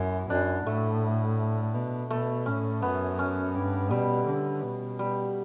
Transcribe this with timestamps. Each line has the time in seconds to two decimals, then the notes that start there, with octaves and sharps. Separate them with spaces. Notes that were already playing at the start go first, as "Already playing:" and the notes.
Already playing: F#2 E4 F#4
0.30 F#2 D4
0.66 A2 A3
1.74 B2
2.11 B2 A3
2.46 A2 C#4
2.82 F#2 B3
3.19 C#4
3.55 G2
3.91 B2 G3
4.27 D3
4.63 B2
4.99 G3